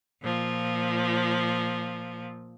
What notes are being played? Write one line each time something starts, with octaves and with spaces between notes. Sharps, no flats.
A#2 F3